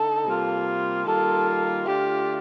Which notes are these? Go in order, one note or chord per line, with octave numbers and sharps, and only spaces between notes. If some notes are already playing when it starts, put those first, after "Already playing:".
Already playing: D3 D#4 A4
C3 G3 A#3 F4
D#3 G3 A#3 F4 A4
D3 A3 D4 F4 G4